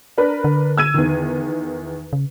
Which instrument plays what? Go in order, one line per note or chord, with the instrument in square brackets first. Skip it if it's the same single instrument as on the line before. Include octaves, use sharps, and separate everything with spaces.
[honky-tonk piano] D4 A#4 B4
[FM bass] D3
[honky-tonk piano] E6 G#6 D#7
E2 D#3
[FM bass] C#3